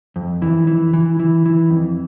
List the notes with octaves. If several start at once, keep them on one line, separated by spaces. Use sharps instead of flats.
F2
E3
E3
E3
E3
E3
F2